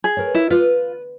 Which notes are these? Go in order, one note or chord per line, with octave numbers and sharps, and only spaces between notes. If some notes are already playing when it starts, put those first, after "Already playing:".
G#4
A#4 B4 C#5
E4
F4 B4